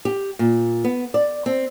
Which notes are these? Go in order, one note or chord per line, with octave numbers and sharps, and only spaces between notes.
G4
A#2
B3
D5
C4